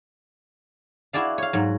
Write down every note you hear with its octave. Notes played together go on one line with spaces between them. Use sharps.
E4 F#4 G#4 D5 F5
C#5 F5
G#2 F#3